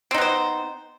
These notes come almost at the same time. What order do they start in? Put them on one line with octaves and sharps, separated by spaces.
C4 D#4 B3 C5